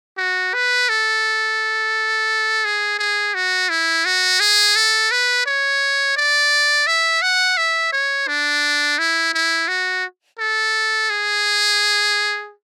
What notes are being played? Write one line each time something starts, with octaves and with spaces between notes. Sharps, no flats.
F#4
B4
A4
G#4
G#4
F#4
E4
F#4
G#4
A4
B4
C#5
D5
E5
F#5
E5
C#5
D4
E4
E4
F#4
A4
G#4